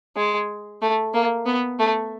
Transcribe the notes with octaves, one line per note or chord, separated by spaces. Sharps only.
G#3
A3
A#3
B3
A3